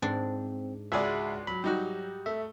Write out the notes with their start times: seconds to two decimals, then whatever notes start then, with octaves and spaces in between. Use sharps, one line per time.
0.02 G#2 C4 D4
0.92 C#2 G#3 F#4 G#4 D5 E5 B5
1.47 F#3 B5
1.64 G3 D#4 F#4 G4
2.26 A3 E5